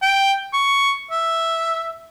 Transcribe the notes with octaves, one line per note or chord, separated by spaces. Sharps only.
G5
C#6
E5